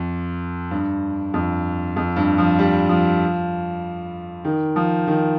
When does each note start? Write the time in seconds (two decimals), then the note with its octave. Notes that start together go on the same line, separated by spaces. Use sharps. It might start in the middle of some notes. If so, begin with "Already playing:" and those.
Already playing: F2
0.71 G2
1.34 F2
1.96 F2
2.16 G2
2.38 F3
2.59 G3
2.89 F3
4.45 D#3
4.76 F3
5.07 D#3